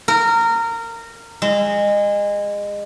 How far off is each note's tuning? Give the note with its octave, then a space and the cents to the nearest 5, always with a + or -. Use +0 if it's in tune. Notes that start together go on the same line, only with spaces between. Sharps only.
A#4 -20
G#3 -25